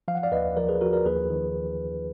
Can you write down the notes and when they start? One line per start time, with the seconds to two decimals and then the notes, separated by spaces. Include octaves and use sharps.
0.08 F3 F5
0.15 F#5
0.23 D5 F5
0.32 D#2 B4 D#5
0.57 F3 A#4 D5
0.68 G#4 B4
0.81 F3 F#4 A#4
0.93 A#4 D5
1.06 D#2 G#4 B4
1.30 D#3